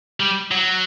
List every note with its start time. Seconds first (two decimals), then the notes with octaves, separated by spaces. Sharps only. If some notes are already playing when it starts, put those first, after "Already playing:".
0.20 G3
0.51 F#3